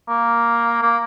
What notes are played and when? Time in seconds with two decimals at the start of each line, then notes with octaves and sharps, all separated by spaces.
0.09 A#3
0.82 A#3